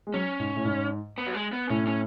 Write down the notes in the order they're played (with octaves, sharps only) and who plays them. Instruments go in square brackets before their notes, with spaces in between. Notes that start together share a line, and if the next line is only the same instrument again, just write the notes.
[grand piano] G#3
[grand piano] F#3 [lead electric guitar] C#4
[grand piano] G#2
A2
G#2
[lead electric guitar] B3
F#3
G#3
B3
[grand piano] A2 [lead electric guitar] C#4
[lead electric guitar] C#4